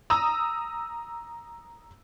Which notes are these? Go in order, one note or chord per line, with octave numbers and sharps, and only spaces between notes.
A#5 D#6 E6